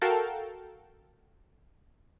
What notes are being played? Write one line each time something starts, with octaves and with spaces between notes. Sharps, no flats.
F#4 A4 A#4 F5 G5 A5